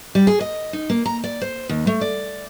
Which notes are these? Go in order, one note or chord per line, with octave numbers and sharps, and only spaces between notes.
G3
G#4
D#5
D#4
A#3
A#5
D5
C5
D#2
A3
D5